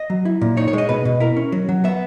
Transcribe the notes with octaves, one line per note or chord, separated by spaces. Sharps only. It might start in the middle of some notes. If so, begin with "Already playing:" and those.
Already playing: D#5
F#3
E4
A#2
D#4 C#5
C#5
G#3 D#5
B2 B4
B2
E4 A#4
C#4
F#3
F#3
B3 E5